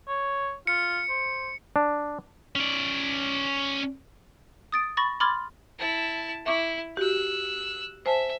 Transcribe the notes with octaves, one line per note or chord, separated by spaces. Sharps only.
C#5
F4 C#7
C5
D4
C#4 D5
D#6 A6 D7
B5 C#6 A6 A#6
B5 C6 D6 F6 G#6 A6
E4 A5
E4 E5 C#6 D6
F#4 G4 E6 F#6
C5 E5 G#5 A5